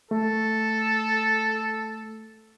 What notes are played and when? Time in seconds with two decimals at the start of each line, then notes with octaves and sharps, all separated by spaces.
0.11 A3 A4